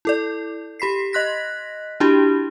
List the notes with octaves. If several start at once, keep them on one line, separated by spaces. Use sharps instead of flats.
E4 A4 D5
G4 B5 B6 C7
D#5 C6 F#6 A#6 B6
D4 E4 F#4 G4